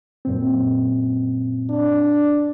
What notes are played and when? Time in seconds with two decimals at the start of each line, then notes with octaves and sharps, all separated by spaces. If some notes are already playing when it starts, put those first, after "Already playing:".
0.25 F#2 A#2 C4
1.70 D4